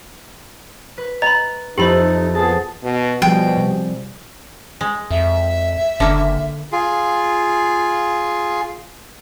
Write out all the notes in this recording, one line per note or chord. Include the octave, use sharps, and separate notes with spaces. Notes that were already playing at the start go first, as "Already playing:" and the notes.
B4
D#5 A#5 B5
F2 D#4 E4 G4 A4 C5 B5 F#7
F3 B3 G#4 A5
B2
B2 F3 G3 G#4 G5
C3 G3
G#3
F2 E5
F#1 D3 A#3
F4 G#4